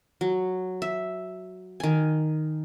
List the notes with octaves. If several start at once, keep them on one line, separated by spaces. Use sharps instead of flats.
F#3
E5
D#3 G#5